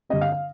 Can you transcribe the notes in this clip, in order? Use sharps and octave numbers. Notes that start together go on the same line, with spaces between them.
G2 D3 G3 C4 D#5
F5
F5